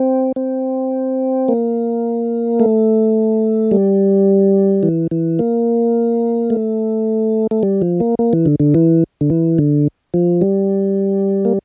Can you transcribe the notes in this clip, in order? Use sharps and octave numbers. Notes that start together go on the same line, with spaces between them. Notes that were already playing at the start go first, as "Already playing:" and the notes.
Already playing: C4
C4
A#3
A3
G3
E3
E3
A#3
A3
A3
G3
F3
A#3
A#3
E3
D3
D3
E3
D3
E3
D3
F3
G3
A#3